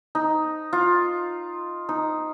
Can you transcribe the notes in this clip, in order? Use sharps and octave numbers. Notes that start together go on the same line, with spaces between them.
D#4
F4
D#4